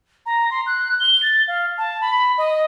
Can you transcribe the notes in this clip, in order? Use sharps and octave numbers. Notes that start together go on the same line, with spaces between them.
A#5
C6
F#6
G7
A6
F5
A5
B5
D#5